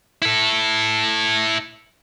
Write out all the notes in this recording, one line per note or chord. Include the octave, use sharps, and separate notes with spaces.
E4 A4